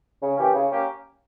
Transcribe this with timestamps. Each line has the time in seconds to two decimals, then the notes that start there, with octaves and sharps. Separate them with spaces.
0.22 C#3
0.38 E3 A#3 C#4 G4
0.54 C#3
0.71 A#3 C#4 G4